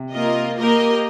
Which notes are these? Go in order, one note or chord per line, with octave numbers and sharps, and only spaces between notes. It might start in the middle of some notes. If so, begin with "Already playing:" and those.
Already playing: C3
A#3 F4 A#4 D#5
A#3 G4 A#4 D#5